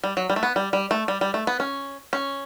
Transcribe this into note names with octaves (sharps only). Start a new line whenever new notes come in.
G3
F#3
G3
A3
B3
G3
G3
A3
G3
G3
A3
B3
C#4
C#4